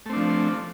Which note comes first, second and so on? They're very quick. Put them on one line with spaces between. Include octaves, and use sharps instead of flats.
A3 C4 D4 F3